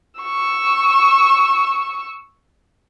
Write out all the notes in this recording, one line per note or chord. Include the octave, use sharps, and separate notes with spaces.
C#6 E6